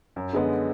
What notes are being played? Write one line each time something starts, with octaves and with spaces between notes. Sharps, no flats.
F#2
D3 G#3 B3